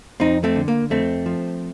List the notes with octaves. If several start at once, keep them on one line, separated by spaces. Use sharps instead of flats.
F2 C4 D#4
A3 C4
D3
A#3
F2 A3 C4
F3